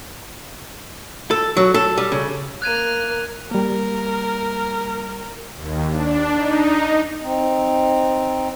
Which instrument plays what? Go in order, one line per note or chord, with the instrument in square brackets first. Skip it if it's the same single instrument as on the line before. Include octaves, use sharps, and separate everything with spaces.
[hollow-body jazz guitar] A4
F#3
A4
G3
C#3
[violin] A#3 F6 [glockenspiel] F#6 G#6 D#7
[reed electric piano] G3 A#3 [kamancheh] A#4
[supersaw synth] D#2
D4
D#4
[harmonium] C4 D#4